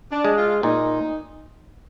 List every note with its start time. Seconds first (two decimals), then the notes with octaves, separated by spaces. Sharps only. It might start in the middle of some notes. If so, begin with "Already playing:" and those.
0.12 D4
0.24 G#3
0.37 F4
0.63 A#2 D#4